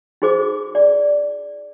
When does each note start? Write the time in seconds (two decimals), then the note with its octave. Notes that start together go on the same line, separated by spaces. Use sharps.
0.22 D#4 F#4 G#4 C5 D6
0.75 D5